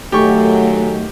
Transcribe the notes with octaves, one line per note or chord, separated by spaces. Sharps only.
D#3 F#3 A3 G4 A4 G#5 C#6